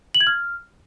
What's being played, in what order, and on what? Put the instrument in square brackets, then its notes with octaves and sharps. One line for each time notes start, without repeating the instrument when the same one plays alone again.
[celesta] F#7
G#6
F6